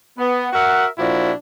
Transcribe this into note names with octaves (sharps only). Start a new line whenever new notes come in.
B3
F#4 A#4 E5 F#5
A#2 F3 D4 E4 F#4